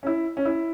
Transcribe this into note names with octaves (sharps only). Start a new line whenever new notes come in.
C#4
E4
C#4
E4